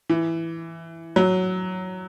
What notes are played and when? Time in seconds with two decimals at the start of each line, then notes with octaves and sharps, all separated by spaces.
0.09 E3
1.16 F#3